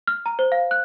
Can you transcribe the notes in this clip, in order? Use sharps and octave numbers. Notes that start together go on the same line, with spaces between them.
F6
A#5
C5
F5
F#6